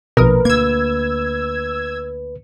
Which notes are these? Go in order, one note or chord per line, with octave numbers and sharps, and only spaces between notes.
A#1 B2 A#4 B4 D#6
D2 A#3 E6 G#6